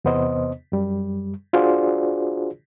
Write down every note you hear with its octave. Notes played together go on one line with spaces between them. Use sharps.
E2 C3 B3 C5 D#5
F#2 G3
D4 F4 F#4 G#4 C5 D5